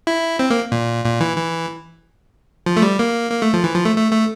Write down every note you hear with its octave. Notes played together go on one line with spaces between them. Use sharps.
E4
C4
A#3
A#2
A#2
E3
E3
F3
A3
G3
A#3
A#3
A3
F3
E3
F3
A3
A3
A3